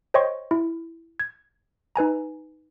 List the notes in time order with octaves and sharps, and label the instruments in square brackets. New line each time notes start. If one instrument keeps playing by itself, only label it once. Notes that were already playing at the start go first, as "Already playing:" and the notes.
[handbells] C5 C#5 D#5 G5 C6 C#6
E4
G#6
D#4 B4 G#5 A#5